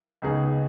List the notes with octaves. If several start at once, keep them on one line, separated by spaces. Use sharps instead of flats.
C#2 C#3 B3 D#4 G#4